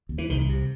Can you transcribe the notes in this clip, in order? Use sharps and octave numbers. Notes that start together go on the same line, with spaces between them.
D#2
E3
C2 D#3
C3